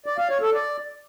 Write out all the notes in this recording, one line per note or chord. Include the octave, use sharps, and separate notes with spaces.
D5
F5
C#5
A4
D5